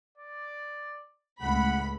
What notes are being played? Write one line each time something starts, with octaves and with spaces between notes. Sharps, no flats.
D5
C#2 A2 F#5 B5